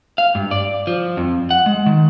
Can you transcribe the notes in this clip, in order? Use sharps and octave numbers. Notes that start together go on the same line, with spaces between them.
F5
G2
D5
F3
F2
F#5
G#3
D#3